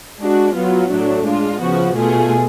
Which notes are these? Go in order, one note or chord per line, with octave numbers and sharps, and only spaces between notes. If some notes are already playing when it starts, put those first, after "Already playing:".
G#3 D4 F#4
F#3 B3 F4
A2 F#3 A3 D4
G#3 D4 F4
C#3 F3 B3 F#4
B2 A3 F4 G#4